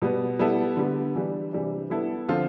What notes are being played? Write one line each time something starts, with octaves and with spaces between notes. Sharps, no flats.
B2 G3 B3
G3 B3 E4 A4
D3 G3 B3
E3 G3 D4
C3 E3 G3 D4
G3 B3 E4 A4
D3 F3 C4 F4 A4